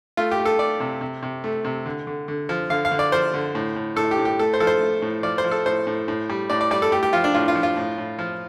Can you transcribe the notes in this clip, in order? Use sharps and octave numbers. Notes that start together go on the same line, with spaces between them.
A3 F4
G4
A3
A4
A3 D5
C3
C3
C3
A3
C3
D3
D3
D3
F3
D3 F5
F5
D3
D5
F3 C5
D3
A2
A2
A2 A4
G4
A2
G4
A3 A4
C5
F3 A4
C5
A3
A2
F3 D5
C5
F3
A4
A2 C5
A2
A2
G3
A2 D5
D5
G3 D5
A4
A3 G4
G4
F3 F4
D4
A2 F4
F4
F3
F4
A2
A2
F3